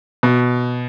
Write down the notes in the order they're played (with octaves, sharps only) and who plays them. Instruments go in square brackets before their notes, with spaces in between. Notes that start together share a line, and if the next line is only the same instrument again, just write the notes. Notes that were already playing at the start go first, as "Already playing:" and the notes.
[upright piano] B2